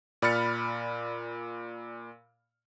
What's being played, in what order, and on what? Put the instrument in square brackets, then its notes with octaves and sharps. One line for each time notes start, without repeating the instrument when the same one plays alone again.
[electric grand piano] A#2 D5 B5 F6 A6 C#7